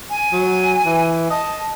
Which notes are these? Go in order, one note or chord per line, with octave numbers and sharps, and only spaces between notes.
G#5
F#3
E3
D#5 A5